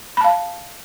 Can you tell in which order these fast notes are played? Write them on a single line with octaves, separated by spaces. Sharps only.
B5 A5 F5